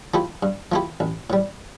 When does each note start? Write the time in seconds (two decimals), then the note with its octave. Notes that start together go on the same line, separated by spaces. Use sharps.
0.14 F3 A3 E4 G4
0.43 G2
0.72 F3 A3 E4 G4
1.00 A1
1.30 A2 G3